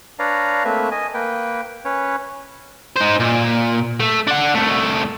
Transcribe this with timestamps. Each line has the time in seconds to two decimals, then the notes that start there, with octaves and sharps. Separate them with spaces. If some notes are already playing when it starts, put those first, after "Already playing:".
0.19 D4 B4 C#5 D5 F5 A#5
0.65 A3 A#3 C4 B4 E5
0.91 D#5 G#5
1.14 A#3 B4 G5
1.85 C#4 B4 C#5
2.96 D#4 C5
3.20 A#2
4.00 A3
4.27 D4 F#5
4.55 C2 A3